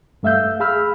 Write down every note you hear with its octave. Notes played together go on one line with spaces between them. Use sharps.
G2 A3 E5 F5 E6 G6
G#4 F5 B5 E6 F6